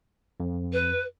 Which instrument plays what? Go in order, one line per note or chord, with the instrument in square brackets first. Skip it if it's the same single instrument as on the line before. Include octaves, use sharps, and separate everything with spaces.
[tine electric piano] F2
[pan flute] B4